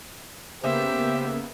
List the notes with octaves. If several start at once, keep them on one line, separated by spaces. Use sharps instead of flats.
C#3 A#3 B3 G4 C5 E5